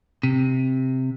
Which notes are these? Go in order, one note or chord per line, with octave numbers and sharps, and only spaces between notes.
C3